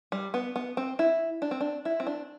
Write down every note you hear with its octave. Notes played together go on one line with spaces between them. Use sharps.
G3
B3
B3
C4
E4
D4
C4
D4
E4
C4
D4